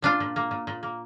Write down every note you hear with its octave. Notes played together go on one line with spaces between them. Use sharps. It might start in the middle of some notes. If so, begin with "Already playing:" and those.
A#2 D4 F4
A#2
A#3
A#2
A#2
A#3